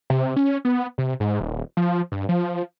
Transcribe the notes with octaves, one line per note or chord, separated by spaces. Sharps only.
C3
C#4
B3
C3
G#2
D#1
F3
G2
F3